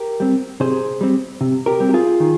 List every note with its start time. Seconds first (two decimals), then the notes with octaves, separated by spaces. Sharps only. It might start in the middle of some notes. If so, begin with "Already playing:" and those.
Already playing: G4 A#4
0.20 G3 C4
0.60 C3 G#4 C5
1.01 G3 C4
1.41 C3
1.66 G4 A#4
1.80 G3 C4
1.89 G4
1.94 F4 G#4
2.20 D#3